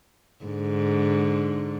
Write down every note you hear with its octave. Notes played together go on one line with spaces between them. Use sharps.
G#2 D3